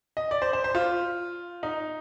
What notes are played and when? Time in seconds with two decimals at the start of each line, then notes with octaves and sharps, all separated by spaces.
0.17 D#5
0.31 D5
0.42 C5
0.53 C5
0.64 C5
0.75 F4
1.63 D#4